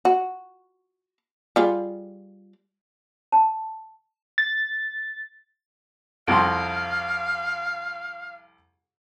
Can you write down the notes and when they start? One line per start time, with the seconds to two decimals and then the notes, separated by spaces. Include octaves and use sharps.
0.05 F#4
1.56 G3 F4 G#4
3.32 A5
4.38 A6
6.27 C2 F2 F5 C6